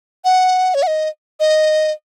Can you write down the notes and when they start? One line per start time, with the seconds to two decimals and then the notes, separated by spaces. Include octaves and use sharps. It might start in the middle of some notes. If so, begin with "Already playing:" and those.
0.25 F#5
0.74 C#5
0.83 F#5
0.87 D#5
1.40 D#5